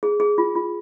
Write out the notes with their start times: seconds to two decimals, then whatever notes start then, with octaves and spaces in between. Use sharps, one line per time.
0.03 G#4
0.20 G#4
0.38 F4
0.56 F4